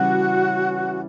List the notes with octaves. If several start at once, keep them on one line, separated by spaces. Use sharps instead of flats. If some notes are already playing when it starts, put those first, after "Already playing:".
Already playing: C#3 E3 G3 C#4 F#4